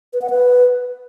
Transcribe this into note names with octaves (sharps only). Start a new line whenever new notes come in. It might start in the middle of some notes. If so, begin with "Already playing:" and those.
B4
F#5
B4